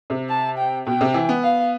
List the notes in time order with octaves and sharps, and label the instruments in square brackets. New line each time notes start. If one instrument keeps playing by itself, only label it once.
[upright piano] C3
[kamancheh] A5
G5
[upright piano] B2 [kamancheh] G5
[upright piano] C3
E3
B3
[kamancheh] F5